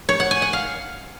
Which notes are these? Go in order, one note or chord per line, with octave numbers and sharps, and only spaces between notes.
C#5
F#5
G#5
F#5
F5